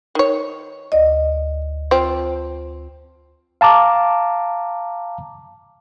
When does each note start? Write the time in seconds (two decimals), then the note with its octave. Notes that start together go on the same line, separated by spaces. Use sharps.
0.15 D#3 C#5
0.92 D2 D5 D#5
1.91 F3 C4
3.61 F5 A5 A#5 D6